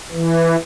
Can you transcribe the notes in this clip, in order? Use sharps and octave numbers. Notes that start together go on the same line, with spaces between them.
E3